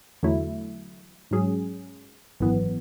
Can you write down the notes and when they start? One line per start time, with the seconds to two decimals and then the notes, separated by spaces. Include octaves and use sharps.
0.23 E2 D3 F#3 A3 E4
1.31 G#2 F#3 C#4 G#4
2.40 G#1 F#2 E3 B3